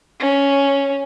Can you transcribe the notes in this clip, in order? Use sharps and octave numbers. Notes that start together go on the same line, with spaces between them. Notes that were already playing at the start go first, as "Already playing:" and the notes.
C#4